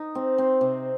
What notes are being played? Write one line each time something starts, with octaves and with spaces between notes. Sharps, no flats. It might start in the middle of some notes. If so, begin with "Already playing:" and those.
Already playing: D#4
C4
C4
C3